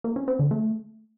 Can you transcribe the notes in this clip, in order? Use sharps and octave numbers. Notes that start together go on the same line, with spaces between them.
A#3
C#4
C4
D3
A3